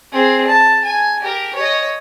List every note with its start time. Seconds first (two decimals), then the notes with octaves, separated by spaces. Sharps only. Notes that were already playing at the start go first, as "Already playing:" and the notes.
0.13 C4 G#4
0.47 A5
0.85 G#5
1.22 G4 A#4
1.56 C#5 D#5